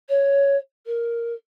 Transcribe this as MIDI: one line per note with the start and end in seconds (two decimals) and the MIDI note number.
0.09 0.56 73
0.86 1.33 70